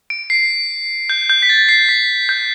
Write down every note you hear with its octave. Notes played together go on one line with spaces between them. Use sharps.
D7
C7
G6
G6
B6
A6
C7
B6
G6